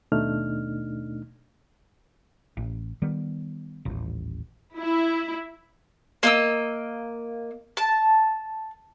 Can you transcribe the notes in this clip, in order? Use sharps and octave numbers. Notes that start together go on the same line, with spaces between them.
D#2 B2 A3 D4 D#4 F6
A1
D#3 G3 B3
D#1 A1
E4
A#3 D#5 E6
A5